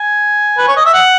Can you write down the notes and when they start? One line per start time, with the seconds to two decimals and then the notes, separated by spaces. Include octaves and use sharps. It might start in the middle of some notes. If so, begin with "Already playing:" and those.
Already playing: G#5
0.58 B4
0.68 C#5
0.77 D#5
0.86 E5
0.94 F#5